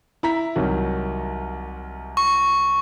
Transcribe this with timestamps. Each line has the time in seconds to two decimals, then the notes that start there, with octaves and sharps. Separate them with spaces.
0.23 E4 A#5 B6
0.56 C2 D#3 F#3
2.17 C#6